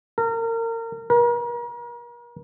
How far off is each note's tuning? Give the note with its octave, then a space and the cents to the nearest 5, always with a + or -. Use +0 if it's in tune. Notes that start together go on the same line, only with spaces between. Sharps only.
A#4 -30
A#4 +40